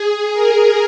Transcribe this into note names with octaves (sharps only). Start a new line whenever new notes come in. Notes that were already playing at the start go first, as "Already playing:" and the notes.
Already playing: G#4
A#4